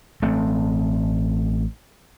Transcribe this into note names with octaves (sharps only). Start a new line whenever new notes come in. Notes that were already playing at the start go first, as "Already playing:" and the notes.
A1 A3 C4